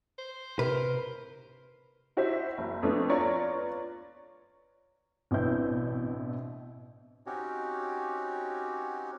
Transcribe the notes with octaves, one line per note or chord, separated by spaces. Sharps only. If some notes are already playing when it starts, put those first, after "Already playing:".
C5
C3 A#4 B4
E4 F#4 G4 C5 D#5 E5
F#1
F2 A3 B3 D4
F4 B4 C#5 D5 A#5 C#6
A1 B2 C4 D4 E4 G6
C4 C#4 D#4 F#4 G4 C#5